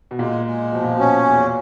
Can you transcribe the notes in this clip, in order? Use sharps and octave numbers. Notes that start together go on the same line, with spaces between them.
B2
A#2 G#3
G#3
B2 F3
A#2
B2 C#4
E2